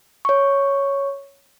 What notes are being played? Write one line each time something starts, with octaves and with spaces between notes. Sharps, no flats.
C#5 C#6